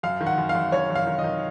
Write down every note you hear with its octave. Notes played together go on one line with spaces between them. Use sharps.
F#2 F5
D#3
F#5
F#2
F5
F#2
F#2 C#5
F#2
F5
D#3
D#5
D#3